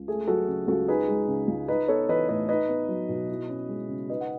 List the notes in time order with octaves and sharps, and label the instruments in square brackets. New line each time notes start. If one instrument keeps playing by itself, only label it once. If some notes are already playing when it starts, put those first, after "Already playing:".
Already playing: [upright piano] C#2
A3 G#4
F#3 F#4 A4
C#3
C#2 F#4 A4
D#4 G#4 B4
G#3
C#3
C#2
D#4 B4 D#5
B3 A4 C#5
E3 B4 D#5
A2 B4 D#5
D#4 B4 D#5
B3
F#3
B2
E4
C#4
G#3
C#3
D#4 B4 D#5
F#5